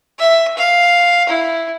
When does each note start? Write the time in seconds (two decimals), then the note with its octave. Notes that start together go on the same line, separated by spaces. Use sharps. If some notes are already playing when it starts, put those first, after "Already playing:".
0.19 E5
0.57 F5
1.29 E4